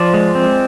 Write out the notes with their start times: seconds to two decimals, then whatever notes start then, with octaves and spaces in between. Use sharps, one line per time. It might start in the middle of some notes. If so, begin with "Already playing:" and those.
Already playing: F3 D5
0.14 G#3
0.35 C4